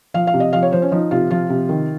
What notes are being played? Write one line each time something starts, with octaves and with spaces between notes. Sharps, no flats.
F3 F5
F5
C3
D#5
F3 F5
C#5
F3 C5
C#4
F3 D#4
C3 F4
F3 F4
C3
D#3